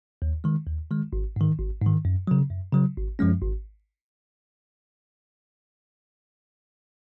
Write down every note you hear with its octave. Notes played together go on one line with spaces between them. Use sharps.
D#2
D#3 G#3
D#2
D#3 G#3
G#1
G#2 D#3
G#1
G#2 D#3
F#2
C#3 F#3
F#2
C#3 F#3
G#1
F#2 F3 G#3 C#4
G#1